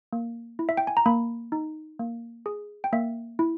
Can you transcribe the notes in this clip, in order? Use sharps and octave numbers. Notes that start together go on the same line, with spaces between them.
A#3
E4
E5
G5
G#5
A#5
A#3 B5
D#4
A#3
G#4
G5
A#3 E5
E4